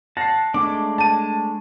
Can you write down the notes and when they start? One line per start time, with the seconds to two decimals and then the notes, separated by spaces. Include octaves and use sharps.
0.17 F#5 A5 A#6 C7
0.54 G#3 A3 D4 D6
0.98 A5 D#7